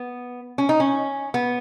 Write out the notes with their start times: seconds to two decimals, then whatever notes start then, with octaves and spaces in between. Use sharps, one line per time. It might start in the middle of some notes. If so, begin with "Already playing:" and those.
Already playing: B3
0.58 C#4
0.69 D#4
0.80 C#4
1.34 B3